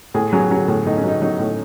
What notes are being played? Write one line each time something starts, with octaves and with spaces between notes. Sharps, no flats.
A2 G#4
F#3 G#4
F#3
A2
A2 D#4
C#4
F#3 D#4
F#3 D#4
A2